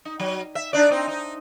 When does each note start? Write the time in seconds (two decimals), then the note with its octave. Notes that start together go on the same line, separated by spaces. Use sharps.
0.05 D#4
0.20 F#3
0.55 E5
0.73 D4 D#4 D5
0.91 C4 D#4
1.08 D#4